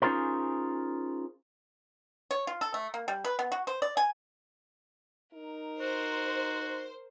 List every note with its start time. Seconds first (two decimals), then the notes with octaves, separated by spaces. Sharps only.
0.02 C#4 D#4 F4 G#4 A#4 C5
2.31 C#5
2.47 F4
2.61 A4
2.74 A3
2.94 A#3
3.08 G3
3.24 B4
3.39 B3
3.52 F#4
3.67 C5
3.82 D5
3.97 G#5
5.34 D#4 A#4
5.81 F#4 C5